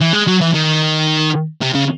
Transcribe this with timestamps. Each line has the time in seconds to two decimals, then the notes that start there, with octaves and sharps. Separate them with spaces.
0.01 E3
0.13 G#3
0.28 F#3
0.41 E3
0.54 D#3
1.61 C3
1.75 C#3